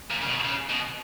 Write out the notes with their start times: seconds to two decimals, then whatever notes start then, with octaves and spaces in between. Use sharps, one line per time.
0.11 A#2
0.22 C#3
0.28 B2
0.45 C#3
0.70 B2